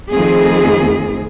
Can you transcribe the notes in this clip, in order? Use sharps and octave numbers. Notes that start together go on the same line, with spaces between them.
F2 D#3 A3 C4 G#4